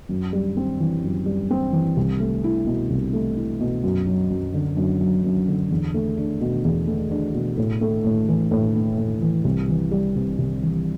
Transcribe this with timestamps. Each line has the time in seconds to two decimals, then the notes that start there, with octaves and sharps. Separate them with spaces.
0.09 F#2
0.33 G3
0.57 C4
0.80 E3
1.03 F#2
1.26 G3
1.51 C4
1.73 E3
1.97 C2
2.20 A3
2.44 E4
2.66 B2
2.90 C2
3.13 A3
3.37 E4
3.60 B2
3.84 F#2
4.07 F#3
4.30 F#2
4.54 D3
4.77 F#2
5.01 F#3
5.24 F#2
5.48 D3
5.71 E2
5.94 A3
6.17 D4
6.41 B2
6.65 E2
6.87 A3
7.11 D4
7.34 B2
7.57 A2
7.81 A3
8.04 A2
8.29 E3
8.51 A2
8.75 A3
8.98 A2
9.22 E3
9.44 C2
9.69 E3
9.91 G3
10.16 C3
10.38 C2
10.62 E3